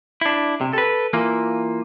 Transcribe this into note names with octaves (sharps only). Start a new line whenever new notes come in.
D4 E4
C3
A4 B4
E3 A#3 F4